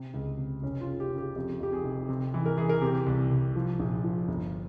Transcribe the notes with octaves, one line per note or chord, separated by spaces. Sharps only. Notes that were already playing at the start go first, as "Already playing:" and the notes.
Already playing: C3
C#2
C3
F1 C#4
F4
C#3
G4
C#3
G4
F2 G4
F2 G4
G#4
F1
C3
E3
A#4
E3 G#4
A#4
C3 G4
C2
C2
F3
A#1
F3
G1